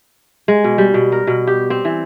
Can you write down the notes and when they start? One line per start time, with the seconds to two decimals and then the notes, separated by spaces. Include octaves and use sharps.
0.48 G#3
0.64 B2
0.78 G3
0.94 B2
1.12 A#4
1.27 B2
1.47 G4
1.70 C4
1.85 E3